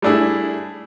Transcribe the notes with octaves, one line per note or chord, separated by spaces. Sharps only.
G3 A3 D4 E4 G#4